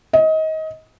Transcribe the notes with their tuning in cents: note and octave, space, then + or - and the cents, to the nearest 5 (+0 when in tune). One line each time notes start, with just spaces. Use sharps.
D#5 +25